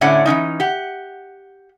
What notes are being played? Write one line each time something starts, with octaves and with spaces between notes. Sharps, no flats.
A2 D3 C#4 E4 D5 F#5
E3 F3 C#4 D#4
G4 F#5